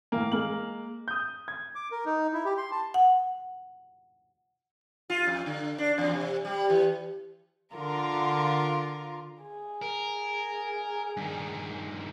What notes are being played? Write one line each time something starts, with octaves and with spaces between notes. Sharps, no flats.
A2 E3 A#3
G#3 A#3 F#7
D#6 G6
G#6
D6
A#4
D#4
E4
G4
C6
A5
F#5
F4
F2
D3
D4
E2
C3
G3
E3
D3 F4 A#4
G#4
A#4
G2 D#3